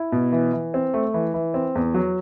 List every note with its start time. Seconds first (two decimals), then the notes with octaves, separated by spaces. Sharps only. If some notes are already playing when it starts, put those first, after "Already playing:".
Already playing: E4
0.12 B2
0.32 E3
0.53 E3
0.74 C4
0.94 A3
1.14 E3
1.34 E3
1.54 C4
1.75 E2
1.94 F#3